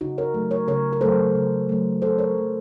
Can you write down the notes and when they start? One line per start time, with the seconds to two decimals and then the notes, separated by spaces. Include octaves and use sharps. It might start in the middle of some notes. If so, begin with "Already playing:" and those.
0.01 C#3 D#4 F#4
0.18 A#4 C#5
0.34 F#3 A3
0.51 A#4 C#5
0.68 C#3 A#4 C#5
0.93 A#4
1.01 F#3 A3 A4 C5
1.36 C#3
1.69 F#3 A3
2.02 C#3 A4 C5
2.19 A#4 C#5
2.36 F#3 A3